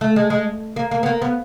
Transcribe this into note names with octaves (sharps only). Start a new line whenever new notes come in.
A3
G#3
G#3
A#3
A#3
B3
A#3
B3